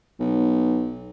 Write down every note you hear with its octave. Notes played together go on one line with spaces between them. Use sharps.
B1